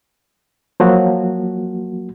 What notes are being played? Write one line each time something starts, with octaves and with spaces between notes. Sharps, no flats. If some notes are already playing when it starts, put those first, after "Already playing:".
F3 F#3 A#3 F#4